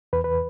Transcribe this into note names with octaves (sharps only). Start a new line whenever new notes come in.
E2 B4
B4